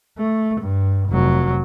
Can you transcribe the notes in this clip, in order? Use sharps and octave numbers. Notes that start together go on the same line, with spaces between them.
A3
G2
F1 F#3